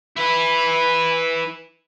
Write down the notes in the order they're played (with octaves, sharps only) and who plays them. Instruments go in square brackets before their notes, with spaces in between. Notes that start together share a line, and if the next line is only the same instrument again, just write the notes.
[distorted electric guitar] E4 B4